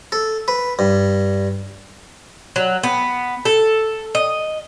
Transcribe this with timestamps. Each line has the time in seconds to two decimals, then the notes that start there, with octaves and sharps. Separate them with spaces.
0.12 A4
0.48 B4
0.79 G2
2.56 F#3
2.83 B3
3.45 A4
4.15 D#5